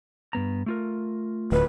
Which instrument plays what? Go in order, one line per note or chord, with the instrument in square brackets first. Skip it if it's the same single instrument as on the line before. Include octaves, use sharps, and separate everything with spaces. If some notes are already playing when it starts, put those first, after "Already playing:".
[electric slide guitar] G2 B3 A#5
A3 F4 A#4
[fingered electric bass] D1 [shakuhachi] B4